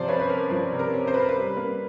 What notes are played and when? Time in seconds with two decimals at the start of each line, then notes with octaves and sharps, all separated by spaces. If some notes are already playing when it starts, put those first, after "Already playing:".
Already playing: C3 F3 C5 D5
0.08 C#4 B4 C#5
0.20 B4
0.29 C#4 A#4
0.50 F3 B4
0.73 C3
0.79 A#4
0.93 C#4
1.07 C5
1.14 C#4 B4
1.22 A#4
1.29 B4
1.36 G3
1.57 A#3